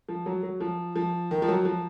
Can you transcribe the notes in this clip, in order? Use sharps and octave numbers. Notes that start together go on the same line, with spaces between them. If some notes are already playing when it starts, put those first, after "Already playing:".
F3
F#3
F#3
F3
F3
D#3
F3
F#3
F3